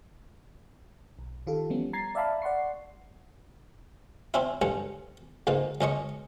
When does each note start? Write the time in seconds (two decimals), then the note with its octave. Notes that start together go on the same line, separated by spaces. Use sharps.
1.19 B1
1.47 D#3 F4 G4 A4
1.70 E3 F3 G3 B3 C#4
1.93 A#5 G#6 A6 C7
2.15 D5 E5 F5 A5 B5
2.42 D5 F#5 C6 C#6 C7
4.34 C4 C#4 E4
4.62 A1 G2 C#4 C#6
5.47 C#2 G#2 A#3
5.81 C#2 C#4 D#5 C#6